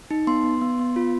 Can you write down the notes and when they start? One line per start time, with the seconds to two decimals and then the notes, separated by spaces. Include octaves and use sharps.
0.11 D#4
0.27 B3 C6
0.44 B3
0.61 B3
0.79 B3
0.96 F4